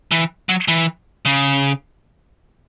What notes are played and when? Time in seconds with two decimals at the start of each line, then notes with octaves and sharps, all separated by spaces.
0.11 E3
0.49 F#3
0.68 E3
1.25 C#3